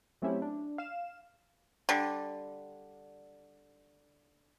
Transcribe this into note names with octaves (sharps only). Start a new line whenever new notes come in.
F#3 A3 C4 C#4 E4 G4
D4
F5 E7
D3 G3